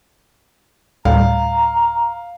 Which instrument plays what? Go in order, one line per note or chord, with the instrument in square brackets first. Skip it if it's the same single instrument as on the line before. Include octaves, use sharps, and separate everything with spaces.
[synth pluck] D2 A2 G3 [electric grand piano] F5 [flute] A#5